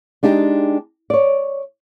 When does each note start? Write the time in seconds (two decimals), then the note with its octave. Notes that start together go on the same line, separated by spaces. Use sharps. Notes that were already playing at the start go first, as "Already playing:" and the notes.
0.23 G#3 D4 D#4 G4
1.10 C#5 D5